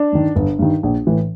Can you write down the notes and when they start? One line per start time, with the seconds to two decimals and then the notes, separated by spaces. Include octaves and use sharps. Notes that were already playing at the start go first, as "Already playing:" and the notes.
Already playing: D4
0.12 G2 D#3
0.36 G1
0.59 G2 D#3
0.83 A#1
1.07 A2 E3